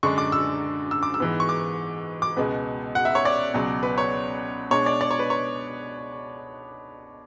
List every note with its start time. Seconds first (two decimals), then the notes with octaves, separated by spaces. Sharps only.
0.03 F#2 D3 G#3 D4 C#6
0.18 D6
0.32 E6
0.91 E6
1.03 D6
1.14 E6
1.20 G#2 E3 B3
1.40 C#6
1.49 D6
2.22 D6
2.37 C#2 B2 G#3 B3
2.95 F#5
3.05 E5
3.15 C#5
3.25 D5
3.54 C#2 B2 F#3
3.83 B4
3.98 C#5
4.70 B2 G#3 D4 C#5
4.86 D5
5.01 D5
5.11 C#5
5.19 B4
5.30 C#5